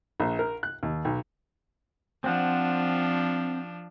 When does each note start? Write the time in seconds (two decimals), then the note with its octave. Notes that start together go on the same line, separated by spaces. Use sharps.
0.20 A#1
0.39 A#4
0.63 F#6
0.83 D#2
1.05 B1
2.24 F3 C4 D4 F#5